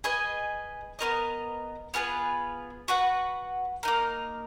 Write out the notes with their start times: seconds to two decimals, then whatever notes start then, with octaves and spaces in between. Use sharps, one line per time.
0.04 G#4 B4 D#5 G#5
0.99 B3 F4 A#4 D#5
1.94 B3 F4 G#4 B4
2.88 F#4 B4 F#5
3.83 A#3 D#4 A#4